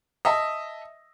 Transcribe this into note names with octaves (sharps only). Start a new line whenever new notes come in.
D#5 E5 A5